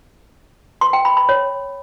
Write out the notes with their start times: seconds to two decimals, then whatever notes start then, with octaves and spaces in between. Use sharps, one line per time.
0.81 C6
0.93 G5
1.05 B5
1.17 B5
1.29 C#5